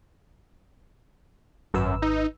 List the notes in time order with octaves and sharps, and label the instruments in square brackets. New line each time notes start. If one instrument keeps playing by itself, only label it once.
[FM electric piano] G#1 B4 E6 [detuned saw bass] F#2
[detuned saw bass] D#4